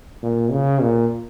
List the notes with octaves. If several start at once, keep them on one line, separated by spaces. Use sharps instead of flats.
A#2
C#3
A#2